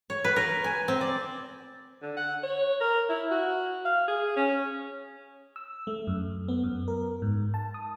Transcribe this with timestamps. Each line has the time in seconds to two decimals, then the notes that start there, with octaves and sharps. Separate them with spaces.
0.10 C#5
0.24 B4
0.36 A#4
0.64 G#5
0.88 C4
1.01 D5
2.02 D3
2.17 F#5
2.43 C#5
2.81 A#4
3.09 E4
3.31 F#4
3.85 F5
4.08 G#4
4.37 C#4
5.56 E6
5.87 A3
6.07 F#2
6.48 B3
6.63 F#2
6.88 A#4
7.22 G#2
7.54 A5
7.74 D#6